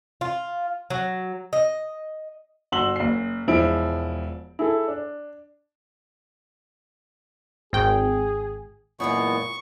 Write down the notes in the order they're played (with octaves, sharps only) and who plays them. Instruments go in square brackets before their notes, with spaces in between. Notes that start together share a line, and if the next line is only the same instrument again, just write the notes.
[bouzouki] F4
F#3
D#5
[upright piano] G1 F#4 C6 E6 F#7 G7
F#1 C7
E1 F3 G#3 E4 D7
E4 G#4 A4
D4
[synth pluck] G#1 G5 [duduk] G#4
[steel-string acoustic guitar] F#2 E3 G#3 [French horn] A#2 [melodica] B3 [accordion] C#6